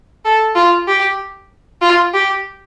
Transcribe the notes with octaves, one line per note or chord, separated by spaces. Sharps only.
A4
F4
G4
F4
G4